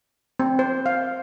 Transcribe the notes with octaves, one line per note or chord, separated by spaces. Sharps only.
C4
C5
F5